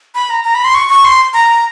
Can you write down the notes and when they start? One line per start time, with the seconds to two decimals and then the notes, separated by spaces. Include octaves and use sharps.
0.15 B5
0.30 A#5
0.44 A#5
0.55 B5
0.64 C6
0.75 C#6
0.90 C#6
1.05 C6
1.34 A#5